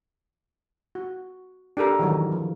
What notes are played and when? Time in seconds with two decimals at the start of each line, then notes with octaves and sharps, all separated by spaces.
0.95 F#4
1.77 D4 G4 A4 A#4
1.99 D#3 E3 F#3
2.32 F3